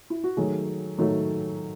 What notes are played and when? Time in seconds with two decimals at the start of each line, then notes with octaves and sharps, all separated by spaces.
0.10 E4
0.24 F#4
0.37 D#3 F#3 A3 G#4
0.98 D#3 F#3 A3